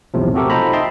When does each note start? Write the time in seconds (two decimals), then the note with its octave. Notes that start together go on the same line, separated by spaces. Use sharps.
0.14 B1 E2 A2 C3 F3
0.34 A3 C4 F#4 G4 A4 A#4
0.50 D#4 F4 A4 C5 A#5 B5
0.73 D#5 E5 G5 A5 C6